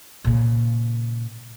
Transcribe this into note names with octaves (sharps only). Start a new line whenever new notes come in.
A#2 C#3